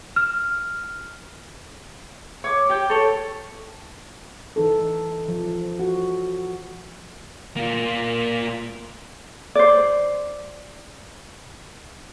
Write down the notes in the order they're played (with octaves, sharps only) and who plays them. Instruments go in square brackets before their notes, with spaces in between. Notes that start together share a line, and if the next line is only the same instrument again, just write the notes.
[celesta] F6
[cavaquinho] C#5 D6
G4 G5
A4 C#5
[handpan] E3 D#4 A4
F3
F#4
[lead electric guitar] A#3 F4
[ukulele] C5 D5